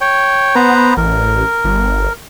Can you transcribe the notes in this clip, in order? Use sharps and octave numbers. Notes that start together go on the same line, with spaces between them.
C#5 G5
B3 B4 C5 A#5
A1 A#4
G1